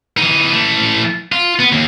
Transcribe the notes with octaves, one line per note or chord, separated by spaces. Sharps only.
E3 D#4
E3 A3
F4
B3
D#2